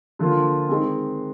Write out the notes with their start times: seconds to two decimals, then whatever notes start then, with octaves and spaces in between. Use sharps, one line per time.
0.19 D3 F3 A#3 F4
0.69 D#3 G#3 C4